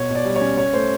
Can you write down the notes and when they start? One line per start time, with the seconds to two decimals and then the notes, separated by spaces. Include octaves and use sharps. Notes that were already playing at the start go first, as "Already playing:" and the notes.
Already playing: B2 C#5
0.10 B2
0.15 D5
0.25 G3
0.36 C#5
0.41 C#4
0.57 C#4 C#5
0.73 A3 C5